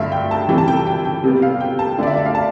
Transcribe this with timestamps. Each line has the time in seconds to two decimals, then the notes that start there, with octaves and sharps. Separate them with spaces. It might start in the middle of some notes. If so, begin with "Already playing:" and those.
Already playing: G2 D3 A3 D4 E5 F5
0.12 G5
0.31 A5
0.49 C3 E3 G3 G5
0.58 A5
0.68 G5
0.77 A5
0.87 G5
1.05 G5
1.24 C3 G3 B3
1.42 F5
1.60 G5
1.79 A5
1.98 D3 A3 D4 D5
2.07 E5
2.17 E5
2.26 F5
2.35 A5